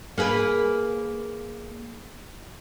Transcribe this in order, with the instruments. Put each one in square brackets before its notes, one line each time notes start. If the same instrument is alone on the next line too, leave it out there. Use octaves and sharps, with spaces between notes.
[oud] A#3 G#4 B4